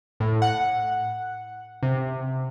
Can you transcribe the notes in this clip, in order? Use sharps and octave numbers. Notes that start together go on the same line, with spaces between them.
A2
F#5
C3